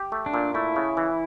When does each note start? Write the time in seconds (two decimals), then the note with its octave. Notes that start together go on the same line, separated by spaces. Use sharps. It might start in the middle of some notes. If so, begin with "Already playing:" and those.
Already playing: G4
0.12 A3
0.26 D4
0.34 A#2
0.54 A3 E4
0.76 C#3
0.97 E3